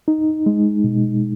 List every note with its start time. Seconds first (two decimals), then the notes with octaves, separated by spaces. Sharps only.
0.08 D#4
0.46 G#3
0.84 B2